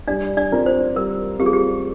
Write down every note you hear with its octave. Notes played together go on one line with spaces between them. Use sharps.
G3 D4 D5
D4 D5
C4 F4 A#4 D5
C5
G3 A#4
C4 F4 G4 A#4 D5
G#4
G4